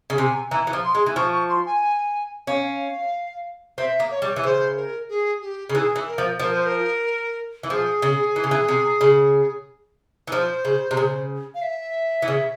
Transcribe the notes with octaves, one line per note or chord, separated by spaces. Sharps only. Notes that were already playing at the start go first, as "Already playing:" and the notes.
C#3
C3 G#5
E3 A#5
E3
F3
C6
G#3
E3
F3 C#6
C#6
C6
G#5
C#4 F5
C4 E5
A#3
C#5
G3
E3
C#3 C5
A#4
G#4
G4
C#3
E3 G#4
E3
A#4
F3
F3 A#4
C5
A#4
E3
F3 G#4
C#3
E3
C#3
E3
C3
C#3
E3
F3 C5
C#3
C3
C#3
F5
E5
E3
C#3